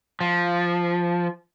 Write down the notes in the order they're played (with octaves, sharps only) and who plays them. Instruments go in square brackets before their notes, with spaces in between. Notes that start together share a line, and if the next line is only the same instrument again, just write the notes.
[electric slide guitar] F3